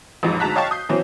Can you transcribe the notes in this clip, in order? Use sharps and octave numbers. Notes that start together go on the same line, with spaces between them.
A1 F2 G#2
D2 G#2 A5 A#5 F#6 B6
C#5 D#5 F5 G5 A5 C#6
D#6 G6 C7
B2 E3 F#3 C4 C#4